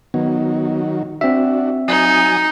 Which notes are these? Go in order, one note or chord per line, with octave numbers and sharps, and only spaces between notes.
D#3 F#3 B3
C4 D4 F#4 E5
F#3 D#4 G#5 D#6